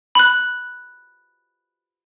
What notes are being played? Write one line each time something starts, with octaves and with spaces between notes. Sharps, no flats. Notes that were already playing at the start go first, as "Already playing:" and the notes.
B5 F#6